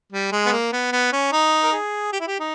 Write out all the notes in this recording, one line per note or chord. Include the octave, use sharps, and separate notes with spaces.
G3
G#3
B3
A#3
B3
B3
C#4
D#4
A#4
G#4
G4
E4
G4
D#4